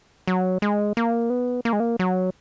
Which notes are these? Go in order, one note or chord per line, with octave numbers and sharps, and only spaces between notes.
F#3
G#3
A#3
B3
A#3
G#3
A#3
F#3